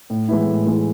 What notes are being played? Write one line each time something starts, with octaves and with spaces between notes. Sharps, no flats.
A2
E3 G#3 B3 E4
A2
E3 G#3 B3 E4